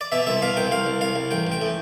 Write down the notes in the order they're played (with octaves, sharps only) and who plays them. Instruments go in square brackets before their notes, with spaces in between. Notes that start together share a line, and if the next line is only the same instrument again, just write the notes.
[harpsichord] D5
B2 E5
C2 E5
B2 F5
C2 G5
C2 F5
C2
C2 F5
C2
A1 G5
A1 G5
A2